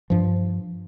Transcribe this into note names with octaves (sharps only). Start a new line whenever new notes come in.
G2 F3